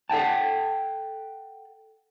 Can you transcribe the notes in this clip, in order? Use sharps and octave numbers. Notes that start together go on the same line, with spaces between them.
A4 F#5 G5 A5